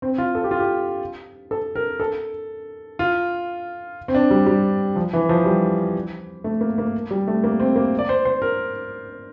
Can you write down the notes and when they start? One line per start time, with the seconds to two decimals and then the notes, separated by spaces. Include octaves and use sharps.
0.02 C4
0.18 F4
0.35 A4
0.44 G4
0.51 F4
0.59 G4
1.51 A4
1.75 A#4
2.00 A4
2.99 F4
4.08 C4
4.15 D4
4.31 G3
4.46 G3
4.96 F3
5.13 E3
5.29 F3
5.45 G3
6.44 A3
6.61 A#3
6.78 A#3
7.11 G3
7.28 A3
7.44 A#3
7.60 C4
7.76 A#3
7.99 D5
8.09 C5
8.25 C5
8.42 A#4